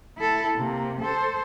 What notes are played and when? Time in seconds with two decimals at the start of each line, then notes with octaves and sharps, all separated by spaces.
0.18 E4 A4
0.56 C3 A#3
1.02 A4 C5